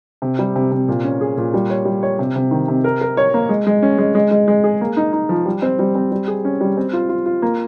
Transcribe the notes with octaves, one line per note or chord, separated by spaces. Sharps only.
C3
G3
C3
C3
A#2
C#4
G#4
A#2
G3
C#5
G3
C#5
C3
C3
D#3
C3
A#4
A#4
C#5
A#3
G#3
G#3
C#4
G#3
G#3
G#3
G#3
G#4
A#3
D#4
D#4
F3
G3
C4
G3
C4
G3
G#4
C#4
G3
C4
F4
F4
F4
A#3